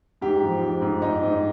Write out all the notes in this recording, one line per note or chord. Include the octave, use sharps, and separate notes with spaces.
G#2 G4
F3
G#2
G#2
G#2 D#4
G#2